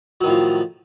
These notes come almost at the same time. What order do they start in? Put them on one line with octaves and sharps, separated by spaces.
F#3 D#3 A2 F3